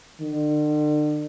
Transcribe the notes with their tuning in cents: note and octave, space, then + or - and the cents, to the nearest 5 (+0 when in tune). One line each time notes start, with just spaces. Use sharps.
D3 +40